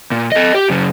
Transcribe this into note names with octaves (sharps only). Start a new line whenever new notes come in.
A#2
A4 D#5
G4
F#2 C#3